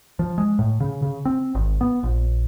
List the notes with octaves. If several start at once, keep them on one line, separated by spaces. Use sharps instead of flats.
F3
G#3
A2
C#3
C#3
C4
G#1
B3
A#1